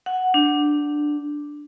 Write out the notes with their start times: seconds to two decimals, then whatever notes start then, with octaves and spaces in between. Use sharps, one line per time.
0.06 F#5
0.34 D4